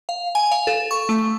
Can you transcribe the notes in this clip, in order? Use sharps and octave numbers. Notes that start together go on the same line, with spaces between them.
F5
G#5
F5
A4
C#6
A3